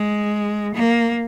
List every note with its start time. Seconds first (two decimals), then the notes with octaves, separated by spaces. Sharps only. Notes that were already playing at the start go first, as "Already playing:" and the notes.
Already playing: G#3
0.75 A#3